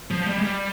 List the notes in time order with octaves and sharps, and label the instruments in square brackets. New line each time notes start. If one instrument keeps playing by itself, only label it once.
[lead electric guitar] F3
F3
G3
G#3
G3